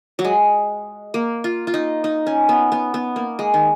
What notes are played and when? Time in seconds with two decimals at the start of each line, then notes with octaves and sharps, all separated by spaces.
0.19 F#3
0.24 G#3
1.14 A#3
1.44 F4
1.67 F4
1.74 D#4
2.04 D#4
2.26 C#4
2.49 B3
2.72 B3
2.94 B3
3.16 A#3
3.39 G#3
3.54 D#3